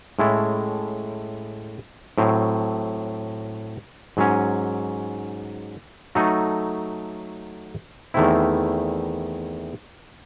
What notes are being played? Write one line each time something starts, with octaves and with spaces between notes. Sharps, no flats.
A2 G#3 C#4 E4 A4
A2 F#3 C4
G#2 F#3 C#4
F#3 A3 D#4 F#4 A4
E2 D#3 A3 C4 E4